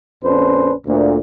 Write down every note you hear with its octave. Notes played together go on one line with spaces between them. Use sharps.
A#1 F2 C#4 D4 B4 C5
D2 A#2